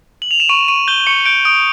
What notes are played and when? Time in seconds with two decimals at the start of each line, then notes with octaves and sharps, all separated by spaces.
0.22 F#7
0.31 F7
0.40 E7
0.49 C#6 D#7
0.68 C#6 D#7
0.88 G6 G7
1.07 C#6 C#7
1.25 G6 D7
1.45 D#6 D7